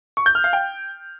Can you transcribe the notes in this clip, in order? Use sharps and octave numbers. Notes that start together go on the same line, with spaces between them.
C#6
G6
F6
F5
G5